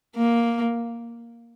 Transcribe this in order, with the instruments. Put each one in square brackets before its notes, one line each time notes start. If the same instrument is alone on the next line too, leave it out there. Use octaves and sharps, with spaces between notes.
[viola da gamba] A#3